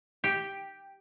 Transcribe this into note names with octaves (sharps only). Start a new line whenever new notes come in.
G4